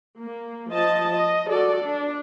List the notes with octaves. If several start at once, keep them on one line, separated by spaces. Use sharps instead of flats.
A#3
F3 D#5 A5
D#5
F#4 A4 D5
D4